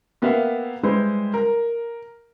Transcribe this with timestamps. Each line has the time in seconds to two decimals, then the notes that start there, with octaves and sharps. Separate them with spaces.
0.22 A#3 B3 G4 E5 F5
0.83 G3 G#3 E4 B4 C5
1.34 A#4